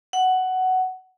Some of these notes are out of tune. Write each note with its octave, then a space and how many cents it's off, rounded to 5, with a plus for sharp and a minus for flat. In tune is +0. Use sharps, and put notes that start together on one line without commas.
F#5 +10